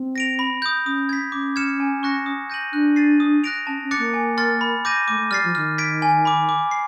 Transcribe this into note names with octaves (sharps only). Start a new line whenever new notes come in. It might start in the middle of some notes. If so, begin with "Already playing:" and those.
Already playing: C4
A#6 D7 F7
B5
D#6 G6
C#4 D#6
G#6 B6
C#4 D6
F6 G#6 C#7 E7
G#5
C#6 F#6 A#6 C#7
D#6
G6 A#6 D#7 F#7
D4 F#6
A6 C7 D#7
D#6
F#6 A#6 D7 F7
C#4 A5
C#4
D6 F#6 A6 C#7
A#3
G#5
C6 F6 A6
B5
D6 G6 A#6 D#7
A3 D6
A3
G3 F6 A6 C7
F3
D#3 F6
G#6 B6 D7
G#5
B5 D6
D6
C7